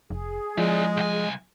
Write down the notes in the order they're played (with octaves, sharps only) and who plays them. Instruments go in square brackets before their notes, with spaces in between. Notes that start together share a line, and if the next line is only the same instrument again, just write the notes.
[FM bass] F1 [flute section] G#4
[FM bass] F3 [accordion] G#3 [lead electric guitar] E4 D5
[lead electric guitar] C2 G#5